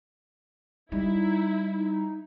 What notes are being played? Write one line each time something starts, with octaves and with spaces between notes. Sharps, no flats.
G3 D#4 E4